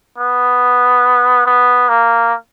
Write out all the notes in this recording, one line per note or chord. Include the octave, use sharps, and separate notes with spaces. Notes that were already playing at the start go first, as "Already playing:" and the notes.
B3
B3
A#3